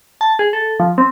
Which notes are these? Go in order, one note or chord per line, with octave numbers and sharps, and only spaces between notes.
A5
G#4
A4
F3
C4